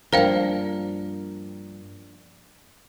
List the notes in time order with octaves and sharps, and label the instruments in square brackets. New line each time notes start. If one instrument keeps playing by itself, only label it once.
[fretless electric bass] G2 F3 [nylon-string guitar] A#3 D4 A#4 [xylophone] C5 F5 G5